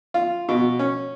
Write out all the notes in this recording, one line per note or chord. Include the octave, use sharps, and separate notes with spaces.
F4
B2
C#4